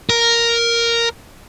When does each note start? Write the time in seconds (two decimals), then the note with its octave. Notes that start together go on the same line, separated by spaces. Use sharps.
0.10 A#4